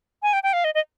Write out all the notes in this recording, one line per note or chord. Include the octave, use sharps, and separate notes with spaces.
G#5
G5
G5
F5
D#5
D#5